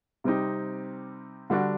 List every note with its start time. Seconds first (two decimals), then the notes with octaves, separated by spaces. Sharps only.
0.24 C3 G3 C4 D#4 G4
1.50 D3 G3 D4 F#4